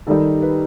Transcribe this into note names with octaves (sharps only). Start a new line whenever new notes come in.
D#3 G3 D#4 A4
B4